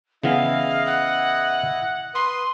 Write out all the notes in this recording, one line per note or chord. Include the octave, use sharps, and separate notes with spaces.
C#3 E3 B3 E4 D#5 F5
F#5
B4 C6 D#6